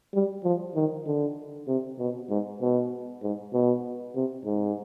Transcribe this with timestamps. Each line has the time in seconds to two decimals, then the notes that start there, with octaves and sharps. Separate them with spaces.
0.14 G3
0.44 F3
0.75 D#3
1.07 D3
1.67 C3
1.99 B2
2.29 G#2
2.61 B2
3.23 G#2
3.53 B2
4.15 C3
4.45 G#2